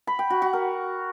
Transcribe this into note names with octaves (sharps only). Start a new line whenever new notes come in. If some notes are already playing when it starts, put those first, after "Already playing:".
B5
G5
F#4
F#4
A#4